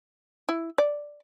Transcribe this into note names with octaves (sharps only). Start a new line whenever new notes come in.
E4
D5